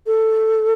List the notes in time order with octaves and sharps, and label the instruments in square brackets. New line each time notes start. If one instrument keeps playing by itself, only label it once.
[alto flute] A4